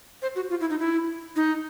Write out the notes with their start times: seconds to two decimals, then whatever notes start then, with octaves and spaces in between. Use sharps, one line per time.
0.22 C5
0.36 F#4
0.50 F4
0.61 E4
0.70 D#4
0.80 E4
1.36 D#4